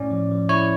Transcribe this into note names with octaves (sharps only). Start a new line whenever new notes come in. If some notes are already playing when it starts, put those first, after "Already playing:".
Already playing: A2 C#4 D5
F3
F3
E4 C#5